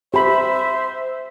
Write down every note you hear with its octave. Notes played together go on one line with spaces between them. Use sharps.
G4 C5 E5 B5